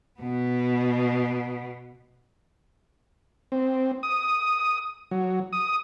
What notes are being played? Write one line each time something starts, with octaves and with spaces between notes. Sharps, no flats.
B2 B3
C4
D#6
F#3
D#6